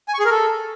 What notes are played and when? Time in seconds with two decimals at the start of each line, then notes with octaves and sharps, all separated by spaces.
0.08 G#5
0.14 C#6
0.19 G#4
0.25 A#4
0.31 A4